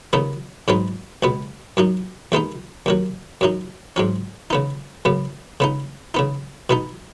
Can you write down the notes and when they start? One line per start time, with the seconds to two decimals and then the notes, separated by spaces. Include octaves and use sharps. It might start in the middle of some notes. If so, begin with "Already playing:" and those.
0.13 D#2 C#3 B3 D#4
0.68 G#2 F#3 B3 D#4
1.23 C#2 B2 B3
1.77 F#2 F#3 D#4
2.32 D#2 D#3 G#3 B3 D#4
2.86 D#2 D#3 F#3
3.41 F#2 F#3 D#4
3.96 G#2 F#3 C#4
4.50 C#3 B3 D#4
5.05 F#2 C#3 B3
5.60 C#3 B3 D#4
6.14 C#3 B3 D#4
6.70 B2 B3 D#4